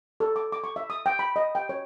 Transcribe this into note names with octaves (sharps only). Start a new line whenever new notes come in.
A4
D6
D6
C#6
E5
D#6
G5
B5
D#5
G5
C#5